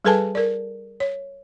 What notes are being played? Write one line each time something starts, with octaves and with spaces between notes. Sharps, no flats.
G3 G#4 A4 B4 G#5 A5
A#4 D5
C#5